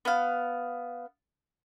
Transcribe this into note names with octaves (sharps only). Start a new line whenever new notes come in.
B3 F5